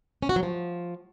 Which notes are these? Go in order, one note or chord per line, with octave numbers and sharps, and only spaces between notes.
C#4
F#4
F#3
F3